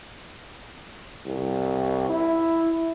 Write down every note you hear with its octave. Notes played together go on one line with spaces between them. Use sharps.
C2
E4